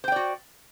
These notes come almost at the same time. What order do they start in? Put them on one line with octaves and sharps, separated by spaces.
C5 G5 D5 F#4